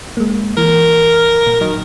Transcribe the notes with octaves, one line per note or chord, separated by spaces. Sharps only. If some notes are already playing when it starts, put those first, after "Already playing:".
G#3 A#3
E3 A#4
A#2
D#3 F#3